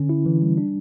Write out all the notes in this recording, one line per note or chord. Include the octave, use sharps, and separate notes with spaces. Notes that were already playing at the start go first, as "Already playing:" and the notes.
Already playing: D3 C#4
E4
E3
G3
D4